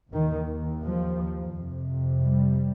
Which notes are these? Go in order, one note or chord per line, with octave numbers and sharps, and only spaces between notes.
D#2 D#3
F3
F2 C3
G3